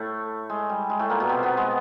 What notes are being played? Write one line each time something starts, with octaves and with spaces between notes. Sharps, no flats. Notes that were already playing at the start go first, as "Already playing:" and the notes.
Already playing: A2 A3
G#3
G3
G#3
A2 A3
A#2 A#3
B2 B3
C3 C4
B2 B3
G#3